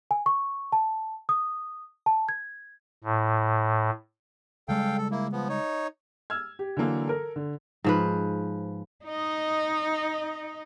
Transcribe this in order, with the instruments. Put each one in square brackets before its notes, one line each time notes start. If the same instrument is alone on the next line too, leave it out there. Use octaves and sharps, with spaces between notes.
[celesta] G#5
C#6
A5
D#6
A5
G#6
[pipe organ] A2
[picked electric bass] C#3 G3 G#3 [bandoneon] A4 F5 G5
[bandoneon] A4
A#3 E4
F3 B3
D#4 C#5
[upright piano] E6 F6 G#6
G4
D3 E3 F#3 A#3 A4
A4 A#4
D3
[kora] G#2 F3 B4
[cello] D#4 D#5